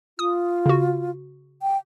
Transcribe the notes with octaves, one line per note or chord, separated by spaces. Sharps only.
F4 D#6
C#3 F#4
G5